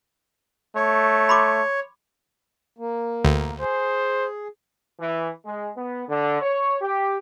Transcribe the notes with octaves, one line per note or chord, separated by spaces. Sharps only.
A3 C#5
B5 C6 D6
A#3
D2
G#4 C5
E3
G#3
B3
D3
C#5
G4